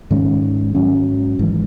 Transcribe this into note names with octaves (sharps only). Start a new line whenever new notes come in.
G#2 D#3 G#3 C#4
G#2 F#3 C#4
G#1 G#2 E3 G#3